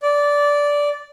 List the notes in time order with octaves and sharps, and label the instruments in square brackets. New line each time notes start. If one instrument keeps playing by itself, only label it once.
[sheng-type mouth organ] D5